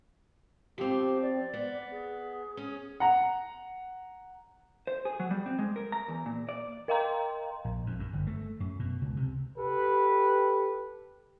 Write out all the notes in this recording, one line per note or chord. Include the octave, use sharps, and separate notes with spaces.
F3 C4 G4
D5
B3
G#4
C#4
F#5 A#5
C5
G#4
F#3
G3
C4
G#3
A#4
A#5
E2
A#2
D5
A#4 D#5 F5 G5 A#5 C6
A#1
F2
F#2
G1
A3
F#2
B2
C#2
C3
G4 A4 B4